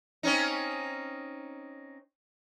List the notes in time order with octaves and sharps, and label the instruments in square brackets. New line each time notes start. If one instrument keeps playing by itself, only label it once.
[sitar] C4 C#4 D#4